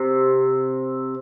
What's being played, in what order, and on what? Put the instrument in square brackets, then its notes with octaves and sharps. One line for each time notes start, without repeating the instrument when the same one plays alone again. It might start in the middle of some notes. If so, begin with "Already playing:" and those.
Already playing: [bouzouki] C3